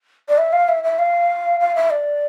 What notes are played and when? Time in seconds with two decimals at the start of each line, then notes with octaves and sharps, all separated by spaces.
0.29 D5
0.38 E5
0.53 F5
0.69 E5
0.84 E5
0.99 F5
1.60 F5
1.75 E5
1.90 D5